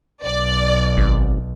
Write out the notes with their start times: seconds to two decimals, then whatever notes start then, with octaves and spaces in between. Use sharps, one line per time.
0.25 B1 D5
0.97 G#1